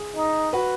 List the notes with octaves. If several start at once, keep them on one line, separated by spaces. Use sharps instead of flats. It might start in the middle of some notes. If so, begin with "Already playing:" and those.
Already playing: G#4
D#4
F#4 B4